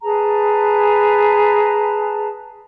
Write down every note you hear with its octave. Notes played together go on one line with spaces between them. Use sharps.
G#4 B4 A5 A#5